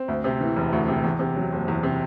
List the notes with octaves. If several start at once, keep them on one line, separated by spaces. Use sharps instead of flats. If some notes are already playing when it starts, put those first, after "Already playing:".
Already playing: C4
D2
C3
E3
E1
D2
C3
E2
C3
F#3
F#1
E2
C3